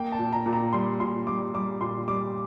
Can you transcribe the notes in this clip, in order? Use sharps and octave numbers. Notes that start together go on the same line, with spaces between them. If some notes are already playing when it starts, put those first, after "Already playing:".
Already playing: A#3 G5
A5
A#2
A#5
A#2
A#5
G3 C6
A#2 C6
G3 D6
G3 D6
A#2 C6
G3 D6